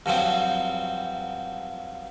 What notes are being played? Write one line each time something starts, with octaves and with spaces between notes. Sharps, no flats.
G2 F3 F#3 C4